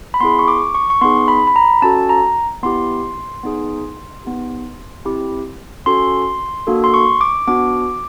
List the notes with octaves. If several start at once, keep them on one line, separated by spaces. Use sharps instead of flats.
B5
B3 E4 G#4 C6
C#6
D6
C#6
C#6
B3 D#4 G#4 C6
B5
B5
A#5
C#4 F#4 A4 A5
A#5
B3 E4 G4 C6
B3 D#4 G#4
B3 D#4 G4
C4 E4 G4
C#4 F#4 A4 C6
A#3 D4 F#4 A4
C6
C#6
D6
B3 D4 F#4 D6